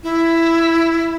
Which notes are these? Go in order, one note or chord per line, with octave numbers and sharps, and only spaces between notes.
E4